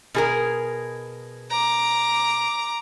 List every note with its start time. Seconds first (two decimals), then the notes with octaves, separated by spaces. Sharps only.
0.14 B2 G#4 A#4
1.50 A#5 D6